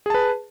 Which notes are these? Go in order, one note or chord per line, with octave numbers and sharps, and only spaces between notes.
G#4 B4 A5